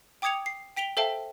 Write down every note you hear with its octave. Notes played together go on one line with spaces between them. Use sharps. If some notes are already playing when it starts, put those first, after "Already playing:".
G5 D6 D#6 G#6 C#7 F7
C7
G5 B6 D7 F7 G7
A4 C5 E5 F5 G5 A5